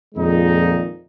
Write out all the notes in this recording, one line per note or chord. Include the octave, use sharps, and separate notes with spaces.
F2 A#2 D#3 G#3 D#4